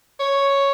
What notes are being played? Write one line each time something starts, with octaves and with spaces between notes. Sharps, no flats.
C#5